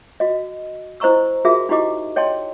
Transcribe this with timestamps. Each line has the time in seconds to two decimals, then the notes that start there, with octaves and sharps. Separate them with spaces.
0.20 F#4 D#5
1.00 E4 C5 D#5 A#5 C#6 E6
1.45 F4 F#4 G#4 A#4 E5
1.69 D#4 E4 F#4 G4 D#5 D6
2.16 C#5 D#5 G5 A5 C6